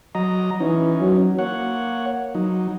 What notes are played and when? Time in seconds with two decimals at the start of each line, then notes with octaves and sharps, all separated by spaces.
0.15 F#3 D#5 A#5
0.60 E3 C#4 D#4
1.00 F#3
1.39 A#3 C#5 F#5
2.35 F#3 D#4